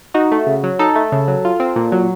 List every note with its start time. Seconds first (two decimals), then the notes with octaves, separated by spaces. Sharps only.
0.14 D#4 F#4
0.32 A3
0.47 C#3
0.63 F#3
0.79 D#4 A4
0.96 A3
1.12 C#3
1.28 F#3
1.45 F4
1.60 C4
1.76 A#2
1.92 F#3